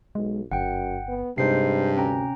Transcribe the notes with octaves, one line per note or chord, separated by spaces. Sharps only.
B1 G#3
G1 F#2 F#5 G5
B3
G2 C3 G#3 D#4 C5 C7
D2 C#4 G5 A#5